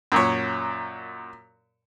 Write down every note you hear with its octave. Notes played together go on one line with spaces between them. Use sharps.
F#2 A#2 C#5